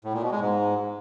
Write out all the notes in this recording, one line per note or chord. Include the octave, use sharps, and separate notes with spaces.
A2
A#2
B2
G#3
G#2